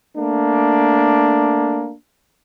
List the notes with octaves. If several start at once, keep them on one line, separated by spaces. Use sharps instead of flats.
A3 A#3 D4